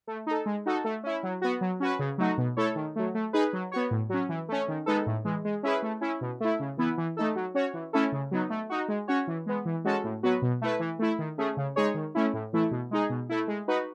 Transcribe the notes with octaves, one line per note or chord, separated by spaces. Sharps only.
A3
D#4 A4
G#3
D#4 F#4 A4
A3
C#4 E4
F#3
B3 F#4
F#3
C#4 F#4 B4
C#3
F#3 A3 D#4 F#4
B2
A3 E4 A4 C#5
D#3
F#3 A3
A3
D#4 G#4 B4
F#3
B3 F#4 C#5
A2
F#3 C#4
E3
A3 C#4
D#3
G#3 B3 D#4 A4
A2
E3 G#3
G#3
C#4 E4 G#4 B4
A3
C#4 E4
B2
A3 E4
C#3
E3 B3 E4 B4
E3
A3 D#4 A4
F#3
C#4 F#4 C#5
E3
A3 C#4 E4 A4
C#3
F#3 B3 D#4
A3
D#4 F#4
G#3
C#4 F#4 C#5
E3
G#3 B3
E3
G#3 C#4 F#4 A4
A2
F#3 B3 F#4 B4
B2
A3 E4 B4
E3
A3 E4
D#3
A3 C#4 G#4
C#3
G#3 D#4 G#4 C#5
D#3
A3 C#4 E4
A2
E3 A3 E4
B2
G#3 D#4 G#4
B2
A3 E4
G#3
D#4 F#4 B4